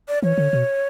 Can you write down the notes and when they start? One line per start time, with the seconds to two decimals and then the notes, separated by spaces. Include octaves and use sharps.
0.08 D5
0.22 E3 C#5
0.38 D3
0.53 B2